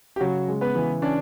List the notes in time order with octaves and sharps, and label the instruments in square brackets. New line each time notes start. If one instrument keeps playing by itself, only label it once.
[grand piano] G4
[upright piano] C#3 [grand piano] F#3 F#4
[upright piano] G#3
[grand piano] B3 B4
[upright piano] E3
[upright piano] C#4 [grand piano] D4 D5